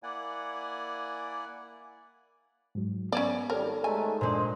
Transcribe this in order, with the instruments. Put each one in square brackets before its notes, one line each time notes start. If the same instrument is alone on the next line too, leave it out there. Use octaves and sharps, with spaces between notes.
[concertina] A#3 E4 D5 F#5 G#5
[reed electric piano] G#2 F#3
[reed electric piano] B3 [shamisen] C#4 C#5 D5
[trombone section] G#1 G3 [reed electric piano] A4 C#5 D5 [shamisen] A#4
[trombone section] G#3 A3 D#4 [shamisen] G#5
[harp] A#2 G#3 [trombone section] D4 C5 [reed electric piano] A#4